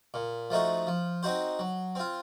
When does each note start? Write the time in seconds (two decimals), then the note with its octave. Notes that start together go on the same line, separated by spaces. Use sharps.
0.14 A#2
0.50 F3 A3 D#4 F#4
0.87 F3
1.23 C4 D#4 F#4 C5
1.59 F#3
1.95 C4 F4